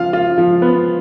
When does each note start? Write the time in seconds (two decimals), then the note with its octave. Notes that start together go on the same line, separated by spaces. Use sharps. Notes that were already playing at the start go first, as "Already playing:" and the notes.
Already playing: F3 F4 F5
0.13 F4
0.38 F3
0.62 B3